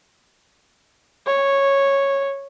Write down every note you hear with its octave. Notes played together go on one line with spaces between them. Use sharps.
C#5